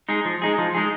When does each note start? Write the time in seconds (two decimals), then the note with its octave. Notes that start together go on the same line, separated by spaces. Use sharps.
0.09 G#3 D#4 G#4
0.25 F3
0.42 G#3 D#4 G#4
0.58 F3
0.74 G#3 D#4 G#4